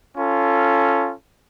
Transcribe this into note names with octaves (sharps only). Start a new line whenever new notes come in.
C#4 F4 A4